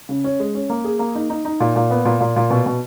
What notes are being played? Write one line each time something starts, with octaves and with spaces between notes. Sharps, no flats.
C#3
C#4
G#3
C#4
A#3
G#4
A#3
D#4
D#4
D#4
A#2
A#2
B3
A#2
A#2
A#2
B2
B2